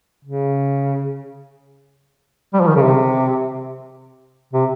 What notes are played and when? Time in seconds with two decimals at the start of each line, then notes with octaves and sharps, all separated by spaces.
0.25 C#3
2.53 G3
2.61 F3
2.67 D#3
2.75 C#3
2.83 C3
4.53 C3